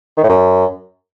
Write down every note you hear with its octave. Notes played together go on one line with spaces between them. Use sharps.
D#3
A2
F#2